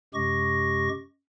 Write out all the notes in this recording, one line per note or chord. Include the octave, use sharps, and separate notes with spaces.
F#2 C3 G#3 G4 C#6 A#6